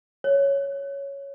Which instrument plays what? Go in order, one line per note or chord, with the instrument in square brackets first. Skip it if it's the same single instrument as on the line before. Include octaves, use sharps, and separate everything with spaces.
[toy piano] C#5